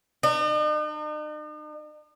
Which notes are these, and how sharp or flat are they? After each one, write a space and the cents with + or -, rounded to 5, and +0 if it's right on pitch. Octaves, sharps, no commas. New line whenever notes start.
D#4 -45